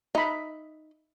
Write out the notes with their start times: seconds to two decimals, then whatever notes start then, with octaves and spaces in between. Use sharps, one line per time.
0.15 D#4 E5 A#5 B5